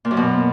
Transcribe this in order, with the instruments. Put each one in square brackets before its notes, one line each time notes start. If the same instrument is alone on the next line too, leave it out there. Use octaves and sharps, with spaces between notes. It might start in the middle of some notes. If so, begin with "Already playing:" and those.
[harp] A#2
F#2
B2